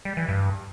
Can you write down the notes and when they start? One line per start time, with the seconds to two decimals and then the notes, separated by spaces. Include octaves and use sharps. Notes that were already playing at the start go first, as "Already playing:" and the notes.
0.05 G3
0.17 E3
0.28 G2